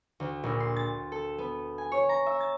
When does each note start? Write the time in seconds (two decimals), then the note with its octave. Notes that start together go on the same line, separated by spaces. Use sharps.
0.20 D2
0.44 A#1
0.60 C6
0.76 A6
1.12 A4
1.38 B3
1.78 G#5
1.92 C#5
2.09 A#5
2.26 E5
2.40 A6